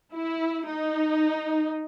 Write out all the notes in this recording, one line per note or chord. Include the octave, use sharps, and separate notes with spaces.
E4
D#4